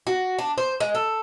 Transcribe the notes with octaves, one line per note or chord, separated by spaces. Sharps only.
F#4
D4
C5
G#3
A4